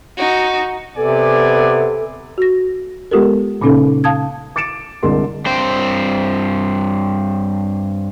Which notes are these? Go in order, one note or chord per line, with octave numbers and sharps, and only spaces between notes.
D#4 F#4
C3 B3 A4 D5 G#5
F#4 A#6
G#3 B3 F4 G4 A4 A#4
A#2 C#3 A#3 C#4 D#4 A4
F5 A5 D#6 G#6
D6 A6 C#7 D7 E7
C2 D3 G#3 A#4 C6
G2 C4 C5